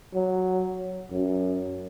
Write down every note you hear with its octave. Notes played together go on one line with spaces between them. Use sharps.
F#3
F#2